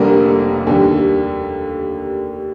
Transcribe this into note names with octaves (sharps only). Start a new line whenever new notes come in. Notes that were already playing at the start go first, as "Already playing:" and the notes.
Already playing: F1 F2 D3 G3 A#3 A#4
D#2 D3 G3